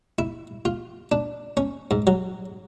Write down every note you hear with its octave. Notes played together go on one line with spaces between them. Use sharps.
E4
F4
D4
C#4
G#2
F#3